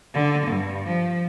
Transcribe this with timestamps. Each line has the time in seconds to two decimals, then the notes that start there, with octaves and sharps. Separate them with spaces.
0.14 D3
0.46 G2
0.87 F3